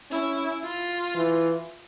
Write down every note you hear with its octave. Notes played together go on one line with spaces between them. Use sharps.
C#4 E4
F4
E3